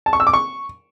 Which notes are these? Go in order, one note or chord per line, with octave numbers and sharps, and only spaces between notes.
A5
C#6
E6
D6
C#6